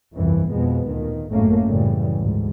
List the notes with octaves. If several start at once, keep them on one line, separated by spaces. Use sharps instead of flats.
G1 C2 F2 E3
F2 B2 G#3 B3
D2 A#2 D#3
G#1 F#2 A2 A3 A#3 C#4
F#2 A2 C#3 E3 G3
D2 G#2